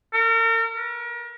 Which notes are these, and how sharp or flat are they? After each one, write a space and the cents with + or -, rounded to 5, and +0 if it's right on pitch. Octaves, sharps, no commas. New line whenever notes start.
A#4 -40
A#4 +40